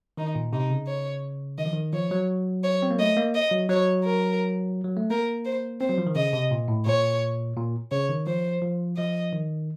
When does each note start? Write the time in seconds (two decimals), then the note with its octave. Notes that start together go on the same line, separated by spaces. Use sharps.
0.17 D#3 D#4
0.35 A#2
0.53 C3 D#4
0.70 C#3
0.88 C#5
1.59 D#3 D#5
1.66 F3
1.73 D#3
1.93 F3 C#5
2.11 F#3
2.64 C#5
2.83 C4
2.91 A#3
2.99 A3 D#5
3.17 A#3
3.35 D#5
3.51 F#3
3.69 F#3 C#5
4.05 A#4
4.84 F#3
4.97 A3
5.10 A#3 A#4
5.45 C5
5.80 C4 C5
5.89 F#3
5.98 F3
6.07 D#3
6.16 C#3 D#5
6.33 C3
6.51 A#2
6.68 A2
6.86 A#2 C#5
7.57 A#2
7.92 C#3 C#5
8.09 D#3
8.27 F3 C5
8.62 F3
8.97 F3 D#5
9.32 D#3